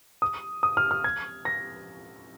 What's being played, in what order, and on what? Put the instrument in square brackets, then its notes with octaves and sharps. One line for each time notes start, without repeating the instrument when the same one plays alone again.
[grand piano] D#6
D#6
F6
F6
G#6
A#6